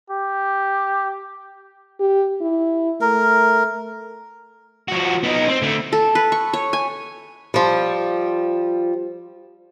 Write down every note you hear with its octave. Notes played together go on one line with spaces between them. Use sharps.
G4
G4
E4
A3 A#4
F3 F#4
B3 D#4
C4
D3 A3
A4
B4
C#6
C#5
G#5
F3 G3